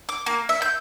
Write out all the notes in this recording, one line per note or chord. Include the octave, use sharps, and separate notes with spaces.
D6
A#3
E5
G6